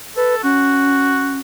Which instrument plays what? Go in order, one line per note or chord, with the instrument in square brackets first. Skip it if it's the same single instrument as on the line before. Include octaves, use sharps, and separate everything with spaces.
[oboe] A4 [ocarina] B4
[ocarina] C#4 [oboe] F#4